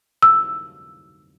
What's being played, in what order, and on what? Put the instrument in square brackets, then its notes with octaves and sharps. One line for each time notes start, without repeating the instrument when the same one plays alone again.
[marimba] E6